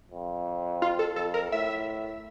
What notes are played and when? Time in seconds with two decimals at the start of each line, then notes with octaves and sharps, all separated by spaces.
0.11 F2
0.82 F4
0.99 A4
1.16 F2 A4
1.34 A#4
1.51 A2 E5